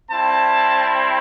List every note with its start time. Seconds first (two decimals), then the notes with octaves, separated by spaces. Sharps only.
0.10 G3 C4 E4 A5